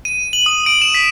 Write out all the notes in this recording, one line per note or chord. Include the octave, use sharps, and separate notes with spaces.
D#7
F#7
D#6
D7
E7
B6